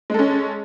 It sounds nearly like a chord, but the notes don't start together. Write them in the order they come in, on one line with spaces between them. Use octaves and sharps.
G#3 A4 C#4